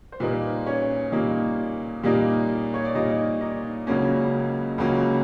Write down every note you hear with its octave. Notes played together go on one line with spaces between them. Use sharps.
C5
A#2 G3 A#3 D#4 B4
C#4 C#5
A#2 G3 A#3 D#4
A#2 G3 A#3 D#4
C#5
D5
A#2 G3 A#3 D#4 D#5
D#4 D#5
C#2 C#3 F#3 A#3 C#4
C#2 C#3 F#3 A#3 C#4